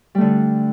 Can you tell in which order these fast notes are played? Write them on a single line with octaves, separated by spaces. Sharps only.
G3 A3 D3